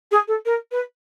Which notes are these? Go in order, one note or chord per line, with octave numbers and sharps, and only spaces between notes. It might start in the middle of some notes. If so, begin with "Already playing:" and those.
G#4
A4
A#4
B4